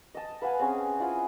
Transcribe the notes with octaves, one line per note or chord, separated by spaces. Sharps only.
D#5 A5
B4 F5 F#5 G#5
C4 C#4 G#4 G#5
E4 F4 F#5 G#5